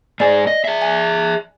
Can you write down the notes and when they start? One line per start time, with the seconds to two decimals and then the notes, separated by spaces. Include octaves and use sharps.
0.20 G#2 G#4 D5
0.47 D#5
0.65 G#4 E5
0.82 G#5